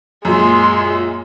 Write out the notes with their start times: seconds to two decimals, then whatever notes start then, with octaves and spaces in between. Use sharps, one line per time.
0.25 F#2 A#2 G#3 C6